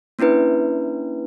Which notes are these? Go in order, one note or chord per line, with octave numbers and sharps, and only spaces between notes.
A#3 C#4 D4 E4 B4